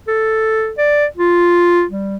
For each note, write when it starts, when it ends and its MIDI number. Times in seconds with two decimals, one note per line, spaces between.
0.08 0.73 69
0.78 1.06 74
1.17 1.84 65
1.90 2.17 55